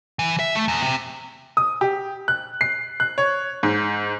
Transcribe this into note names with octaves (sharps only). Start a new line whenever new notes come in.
E3
E5
A3
E2
C3
D#6
G4
F#6
C7
F#6
C#5
G#2